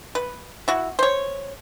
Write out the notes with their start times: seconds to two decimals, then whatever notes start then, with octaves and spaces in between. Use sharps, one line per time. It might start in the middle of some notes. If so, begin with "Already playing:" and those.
0.15 B4
0.68 E4 F#4
0.99 C5 C#5